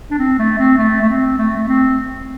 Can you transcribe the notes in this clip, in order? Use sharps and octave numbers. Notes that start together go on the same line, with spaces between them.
D4
C4
A3
C4
A3
A3
C4
A3
A3
C4